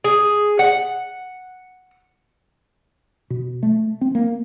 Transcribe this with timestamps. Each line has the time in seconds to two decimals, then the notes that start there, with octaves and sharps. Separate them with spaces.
0.04 G#4
0.59 F#5
3.30 B2
3.63 A3
4.01 C4
4.15 A#3